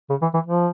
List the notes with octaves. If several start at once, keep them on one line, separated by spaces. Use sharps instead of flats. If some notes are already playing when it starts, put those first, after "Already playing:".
C#3
E3
E3
F3